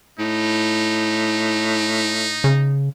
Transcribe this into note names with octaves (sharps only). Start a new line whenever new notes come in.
A2 D#4
C#3